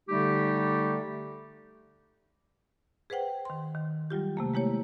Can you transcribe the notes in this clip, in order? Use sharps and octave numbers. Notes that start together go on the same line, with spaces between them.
D3 G3 A3 D#4 G4
G#4 B4 C5 F#5 G5
D#3 C6
D#3
F#3 G3 F4 G4
C3 A3 A#3
G#3 A#3 E4 G4 C#5